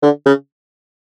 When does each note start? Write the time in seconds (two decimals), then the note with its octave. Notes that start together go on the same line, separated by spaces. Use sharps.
0.03 D3
0.26 C#3